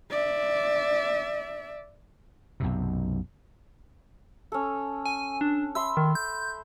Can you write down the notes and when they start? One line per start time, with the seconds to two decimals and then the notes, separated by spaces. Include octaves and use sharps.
0.10 D5 E5
2.60 B1 F#2 C3
4.52 C#4 A4
5.05 G#5
5.41 D4
5.75 E5 B5 C6 E6
5.97 D#3
6.15 G6